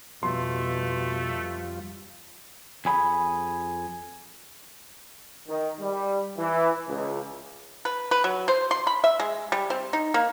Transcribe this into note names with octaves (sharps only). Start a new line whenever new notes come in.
F2 B2 G3 A3 F4 C6
F2 G#4 B5
D#3
G3
E3
C#2
B4
B4
F#3
C5
C6
B5
E5
G#3
G3
C4
D#4
A#3